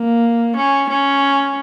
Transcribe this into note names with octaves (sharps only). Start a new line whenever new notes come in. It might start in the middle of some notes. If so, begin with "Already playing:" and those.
Already playing: A#3
C#4
C#4